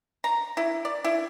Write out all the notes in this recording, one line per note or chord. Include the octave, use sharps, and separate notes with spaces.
A#5
E4
D5
E4